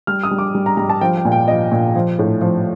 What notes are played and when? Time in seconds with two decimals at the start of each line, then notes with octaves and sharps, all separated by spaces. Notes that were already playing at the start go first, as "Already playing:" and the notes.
0.07 G3 F6
0.23 D#6
0.31 G3
0.38 D6
0.55 G3
0.66 A#5
0.77 G3 A#5
0.89 A5
1.01 F3 G5
1.17 G5
1.25 A#2
1.32 G5
1.48 F3 D#5
1.72 A#2
1.96 F3
2.19 A2
2.41 F3